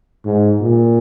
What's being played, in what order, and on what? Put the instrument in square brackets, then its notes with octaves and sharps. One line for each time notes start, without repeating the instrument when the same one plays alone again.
[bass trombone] G#2
A#2